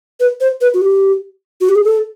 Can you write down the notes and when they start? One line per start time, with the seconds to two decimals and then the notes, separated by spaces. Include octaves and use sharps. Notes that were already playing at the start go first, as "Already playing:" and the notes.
0.20 B4
0.41 C5
0.61 B4
0.74 F#4
0.81 G4
1.61 F#4
1.69 G4
1.76 G#4
1.84 A4